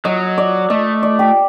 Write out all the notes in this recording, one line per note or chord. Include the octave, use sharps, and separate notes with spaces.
F#3 D#5
D5
A3 D#5
D5
G4